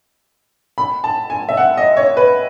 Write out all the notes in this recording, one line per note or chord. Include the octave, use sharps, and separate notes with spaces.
B5
A5
G#5
E5
F#5
D#5
C#5
B4